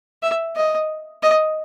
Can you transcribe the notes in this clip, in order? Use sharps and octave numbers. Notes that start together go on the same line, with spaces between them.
E5
D#5
D#5